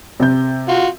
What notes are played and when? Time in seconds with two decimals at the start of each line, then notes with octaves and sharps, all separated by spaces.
0.20 C3 C4 G6
0.69 F4 F#4